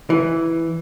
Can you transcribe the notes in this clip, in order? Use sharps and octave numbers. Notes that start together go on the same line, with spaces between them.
E3